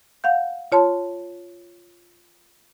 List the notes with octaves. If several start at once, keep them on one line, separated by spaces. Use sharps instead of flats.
F5 F#5 G6
F4 C#5 A5 C6